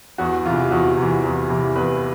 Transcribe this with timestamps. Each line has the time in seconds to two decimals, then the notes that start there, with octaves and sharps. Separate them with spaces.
0.18 E2 F#4
0.45 C3 E3 F4
0.71 E2 F#4
0.97 C3 E3
1.23 E2
1.50 C3 E3
1.76 E2 B4